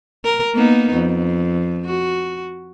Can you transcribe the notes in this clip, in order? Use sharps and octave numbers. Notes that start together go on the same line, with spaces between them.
A#4
A#3 B3 D#4
F2
F#4